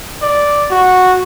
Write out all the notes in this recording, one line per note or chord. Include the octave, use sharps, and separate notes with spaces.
D5
F#4